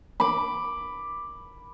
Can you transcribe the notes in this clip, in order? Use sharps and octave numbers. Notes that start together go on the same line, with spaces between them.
B5 D6